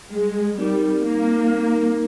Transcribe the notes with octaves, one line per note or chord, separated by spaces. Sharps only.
G3 G#3
G3 C4 D#4 A#4
G3 A#3
C4 D#4 A#4